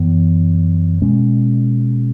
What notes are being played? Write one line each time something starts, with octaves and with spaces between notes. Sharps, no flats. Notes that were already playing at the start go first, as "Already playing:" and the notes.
Already playing: F#2 E3 B3
B2 G#3 C#4